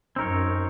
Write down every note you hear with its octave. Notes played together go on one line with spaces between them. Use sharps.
F#2 C4 D#4 A#4 C#5